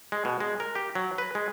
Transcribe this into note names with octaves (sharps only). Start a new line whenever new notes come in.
G#3
B2
G#3
A#4
G4
F#3
B4
G#3